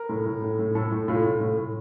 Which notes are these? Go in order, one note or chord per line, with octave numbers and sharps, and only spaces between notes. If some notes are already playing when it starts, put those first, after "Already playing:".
Already playing: A#4
A2
A2
A2
A2
A2 A4
A2
A2 F4
A2
A2
A2